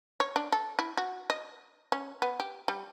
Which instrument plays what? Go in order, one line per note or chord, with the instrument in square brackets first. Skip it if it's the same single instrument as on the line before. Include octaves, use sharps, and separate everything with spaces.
[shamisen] C#5
D4
A4
E4
F#4
D#5
C#4
B3
G4
G3